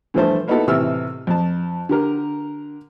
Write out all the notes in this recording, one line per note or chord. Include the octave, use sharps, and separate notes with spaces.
G2 E3 F3 A3 C5 A5
A#3 B3 D#4 E4 F#4 A4
A2 C3 E3 E6 F6
F2 A5
D3 G4 A#4